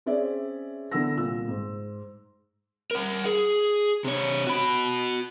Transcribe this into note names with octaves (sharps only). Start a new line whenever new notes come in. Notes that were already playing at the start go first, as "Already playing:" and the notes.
C4 C#4 G#4 D5 E5
D3 E3 B3 F#5 E6 A#6
C2 A#2 E6
G#2
A#4 F#5
G#4
C3 C#5
F#4 B5